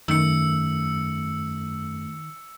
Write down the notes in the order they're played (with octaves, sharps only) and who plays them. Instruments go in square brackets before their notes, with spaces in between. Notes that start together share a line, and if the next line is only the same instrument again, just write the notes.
[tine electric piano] F#2 A3 [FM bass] D#3 [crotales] E6 C#7